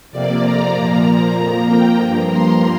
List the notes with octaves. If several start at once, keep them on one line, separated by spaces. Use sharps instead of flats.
F2 C3 A#3 D5
A#5
A#2 F3 A#3 A#5
F2 F3 A#3
G5
G2 F3 A#3 A#5
C6